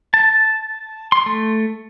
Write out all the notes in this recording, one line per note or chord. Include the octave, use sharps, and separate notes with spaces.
A5
C6
A3